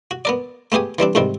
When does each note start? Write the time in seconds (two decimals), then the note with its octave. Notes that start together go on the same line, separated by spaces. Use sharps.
0.11 F#4
0.25 B3 A#4 D5
0.72 A3 B3 G4 G#4 G#5
0.98 E3 G3 C4 D4
1.15 F2 G#2 C3 D#3 G3 C4